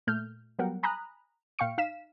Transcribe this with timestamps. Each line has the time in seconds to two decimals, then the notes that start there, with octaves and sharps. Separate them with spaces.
0.07 A#2 A3 F6 G6
0.59 F#3 G3 B3 A#4 F#5 G5
0.83 G#5 A#5 B5 D#6 F#6
1.59 A#2 F5 G5 C#6 C#7
1.78 D#4 F5 B6 E7